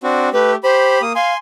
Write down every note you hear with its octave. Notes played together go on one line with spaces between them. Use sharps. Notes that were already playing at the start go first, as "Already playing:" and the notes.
C4 D4 F#4
A3 G4 B4
G4 C5 B5
A#3 D#6
F5 G#5 C6